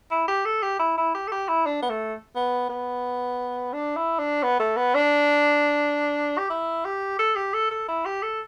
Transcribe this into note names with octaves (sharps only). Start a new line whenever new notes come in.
E4
G4
A4
G4
E4
E4
G4
A4
G4
E4
D4
B3
A3
B3
B3
D4
E4
D4
B3
A3
B3
D4
G4
E4
G4
A4
G4
A4
A4
E4
G4
A4